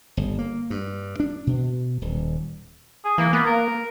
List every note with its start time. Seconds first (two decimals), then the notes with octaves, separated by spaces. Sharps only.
0.17 G1
0.39 A#3
0.70 G2
1.20 D4
1.47 B2
2.02 D#1
3.05 G#4
3.18 E3 A#3
3.33 A#3 B3
3.46 A#4